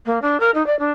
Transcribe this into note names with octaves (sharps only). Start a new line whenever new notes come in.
A#3
D4
A#4
D#4
D5
D4